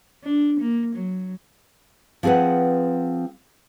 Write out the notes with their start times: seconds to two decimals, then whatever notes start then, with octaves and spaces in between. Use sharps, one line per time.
0.24 D4
0.60 A#3
0.95 F#3
2.23 F3 C4 G#4 B4 F#5